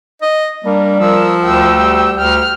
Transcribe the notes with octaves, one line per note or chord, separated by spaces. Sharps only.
D#5
G3 A#3 D4 A#4
F3 A#4 E6
D2 G5 E6
G3
D2 G5 F6